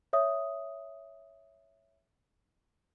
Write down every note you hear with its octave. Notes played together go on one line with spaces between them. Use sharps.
C#5 E5 D#6